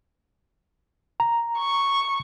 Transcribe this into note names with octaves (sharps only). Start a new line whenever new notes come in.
A#5
C#6